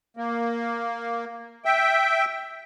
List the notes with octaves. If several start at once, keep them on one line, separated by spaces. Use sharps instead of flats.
A#3
E5 G5